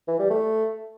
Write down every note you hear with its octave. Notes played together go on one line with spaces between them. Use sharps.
E3
G3
A3